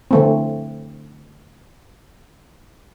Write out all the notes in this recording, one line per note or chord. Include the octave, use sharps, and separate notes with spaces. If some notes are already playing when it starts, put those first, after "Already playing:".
D3 A3 C4